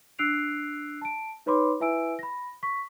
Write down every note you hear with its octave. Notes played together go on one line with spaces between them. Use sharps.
D4 E6 F#6 C7 D7 F7
A5 D7
D#4 B4 C#5 B5 C6 D6
E4 B4 E5 G#5 E6 D7
B5 A#6
C#6 B6